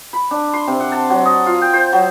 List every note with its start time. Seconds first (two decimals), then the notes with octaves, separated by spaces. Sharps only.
0.13 B5
0.31 D4
0.53 C6
0.67 C3
0.80 F#5
0.92 A5
1.10 F#3
1.25 D#5
1.46 F4
1.62 G5
1.73 C5
1.93 F#3